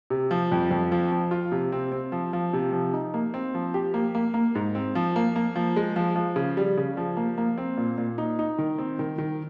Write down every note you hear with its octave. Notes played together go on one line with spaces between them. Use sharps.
C3
F3
F2
F2
F3
F3
F4
C3
C4
C4
F3
F3
C3
F3
D#4
A#3
C4
F3
G4
A#3
A#3
A#3
G#2
C4
F3
A#3
A#3
F3
G#3
F3
F3
C#3
G3
C#3
F3
A#3
A#3
C4
A#2
A#2
D#4
D#4
D#3
C4
D#3
D#3